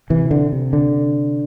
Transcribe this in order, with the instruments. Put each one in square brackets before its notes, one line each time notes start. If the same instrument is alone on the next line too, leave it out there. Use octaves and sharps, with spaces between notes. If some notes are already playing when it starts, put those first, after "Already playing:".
[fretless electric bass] C3 E3
D3
C3
D3